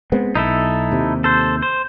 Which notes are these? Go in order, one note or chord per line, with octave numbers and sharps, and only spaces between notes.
G#3 B3 C4
B1 D#4 E4 A4
D#2 C3
A4 C5
C5